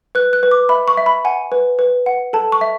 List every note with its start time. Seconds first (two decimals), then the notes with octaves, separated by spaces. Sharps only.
0.15 B4 F#6
0.33 F#6
0.43 B4
0.51 D6
0.69 E5 B5
0.88 C#6
0.97 E5
1.06 B5
1.25 F#5 G#5
1.52 B4
1.79 B4
2.06 F#5
2.33 A4 A5
2.52 C#6
2.61 E5